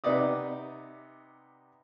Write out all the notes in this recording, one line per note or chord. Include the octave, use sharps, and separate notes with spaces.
C3 B3 D#4 D5 D#6